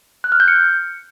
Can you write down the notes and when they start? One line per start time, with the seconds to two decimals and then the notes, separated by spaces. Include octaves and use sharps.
0.24 F#6
0.32 F6
0.40 G6
0.48 C#7